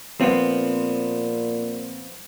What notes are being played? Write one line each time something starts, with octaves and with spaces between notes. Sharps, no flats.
A#2 F3 B3 C4